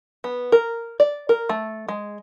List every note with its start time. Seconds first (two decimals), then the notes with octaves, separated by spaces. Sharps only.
0.24 B3
0.52 A#4
1.00 D5
1.29 A#4
1.49 A3
1.88 G#3